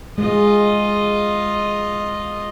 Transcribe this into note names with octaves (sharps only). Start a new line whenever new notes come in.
G#3 F4 D#5